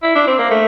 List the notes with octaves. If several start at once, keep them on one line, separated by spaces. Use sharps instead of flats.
E4
D4
C4
A#3
A3